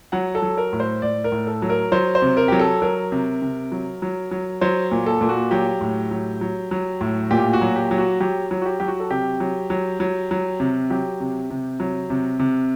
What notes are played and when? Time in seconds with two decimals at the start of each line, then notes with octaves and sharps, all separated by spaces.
0.12 F#3 F#5
0.35 A4
0.42 F#3
0.57 A#4
0.73 A2
0.80 C5
1.02 A2 D5
1.24 A#4
1.32 A2
1.47 A4
1.62 F#3
1.70 A#4
1.92 F#3 C5
2.15 C5
2.22 C3
2.37 A#4
2.48 F#3 G4
2.60 A4
2.82 F#3 A#4
3.12 C3
3.42 C3
3.72 F#3
4.02 F#3
4.31 F#3
4.61 F#3 C5
4.91 A#2
5.06 A4
5.21 A#2
5.29 F#4
5.51 F#3 G4
5.81 A2
6.11 F#3
6.41 F#3
6.71 F#3
7.01 A2
7.31 A#2 G4
7.53 F#4
7.61 F#3
7.76 G4
7.91 F#3
7.98 F#4
8.20 F#3 G4
8.51 F#3
8.62 F#4
8.66 G4
8.80 F#3 G4
8.88 F#4
9.00 A4
9.10 C3 G4
9.40 F#3
9.70 F#3
10.00 F#3
10.31 F#3
10.60 C3
10.90 F#3 G4
11.20 C3
11.50 C3
11.80 F#3
12.10 C3
12.39 C3